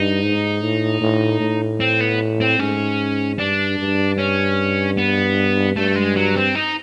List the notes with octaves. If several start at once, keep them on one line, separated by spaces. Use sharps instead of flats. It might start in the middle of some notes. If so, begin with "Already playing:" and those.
Already playing: G2 D#4
G#2
A2
A2
A2
C4
B3
C4
G#2 C#4
G2 D4
G2
C#4
B3
G2 A3
G#3
F#3
C4
D#4